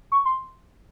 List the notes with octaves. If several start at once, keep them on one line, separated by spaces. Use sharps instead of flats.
C#6
C6